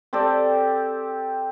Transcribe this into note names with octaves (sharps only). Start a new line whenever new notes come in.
C4 G4 A4 D5